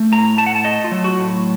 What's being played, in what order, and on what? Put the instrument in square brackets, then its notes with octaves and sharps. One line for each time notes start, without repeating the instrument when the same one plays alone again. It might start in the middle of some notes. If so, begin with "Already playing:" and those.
Already playing: [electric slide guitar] A3
A2 A#5
A3 A5
F#5
A5
A3 D#5
F4
F#3
F#4
A2